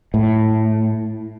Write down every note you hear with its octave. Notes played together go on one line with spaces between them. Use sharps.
A2